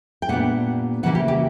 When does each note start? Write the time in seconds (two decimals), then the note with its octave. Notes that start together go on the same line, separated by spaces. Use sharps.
0.22 G5
0.29 A#2 G3 B3 D4 F#5
1.03 C#3 E3 G3 A#3 E4 F#5
1.15 G4
1.28 G4